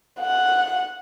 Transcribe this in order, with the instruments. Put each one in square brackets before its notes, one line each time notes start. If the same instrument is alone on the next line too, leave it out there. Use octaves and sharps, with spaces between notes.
[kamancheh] F#5